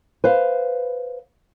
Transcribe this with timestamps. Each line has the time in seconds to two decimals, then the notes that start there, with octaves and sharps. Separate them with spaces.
0.24 B4 C5 F5